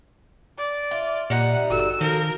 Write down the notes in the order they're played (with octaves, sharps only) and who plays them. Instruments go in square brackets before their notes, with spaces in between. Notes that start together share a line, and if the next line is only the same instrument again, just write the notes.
[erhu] D5
[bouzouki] F4 [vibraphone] E5
[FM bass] A#2 [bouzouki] G3 D#4 [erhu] F#5
[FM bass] G1 [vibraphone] F#4 A4 [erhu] E6
[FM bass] D#3 [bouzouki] F3 [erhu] A#4